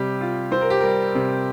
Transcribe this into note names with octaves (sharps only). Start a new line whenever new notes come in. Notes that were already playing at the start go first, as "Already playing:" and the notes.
Already playing: C3 G3 G4
F4
C4 C5
A#4
G4
G3 A#4
C3